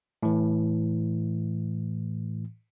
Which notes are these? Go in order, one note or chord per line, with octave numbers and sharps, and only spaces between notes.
A2 E3